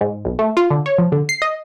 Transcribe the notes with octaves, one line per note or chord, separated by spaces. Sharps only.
G#2
B1
A3
F4
D3
C#5
F3
D3
C7
D#5